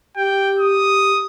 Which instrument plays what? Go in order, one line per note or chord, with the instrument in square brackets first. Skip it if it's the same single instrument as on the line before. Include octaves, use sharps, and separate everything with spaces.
[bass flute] G4 [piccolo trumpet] G5
[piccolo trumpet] D#6